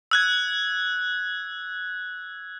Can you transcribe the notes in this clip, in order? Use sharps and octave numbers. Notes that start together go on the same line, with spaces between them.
E6 F#6 G#6